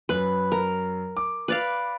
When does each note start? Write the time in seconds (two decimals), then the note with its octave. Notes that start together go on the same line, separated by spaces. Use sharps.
0.09 F#2 B4
0.52 A#4
1.17 D6
1.48 B4 D5 F5